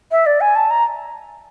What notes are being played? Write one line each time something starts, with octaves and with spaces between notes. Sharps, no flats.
E5
D5
G#5
A5
A#5